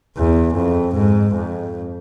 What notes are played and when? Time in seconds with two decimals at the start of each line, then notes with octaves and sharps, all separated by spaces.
0.17 E2
0.56 F2
0.96 G#2
1.35 F2